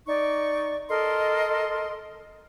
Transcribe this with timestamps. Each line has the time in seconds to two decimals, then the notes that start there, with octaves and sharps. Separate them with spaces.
0.07 D#4 D5 C#6
0.89 A4 A#4 D#5 C6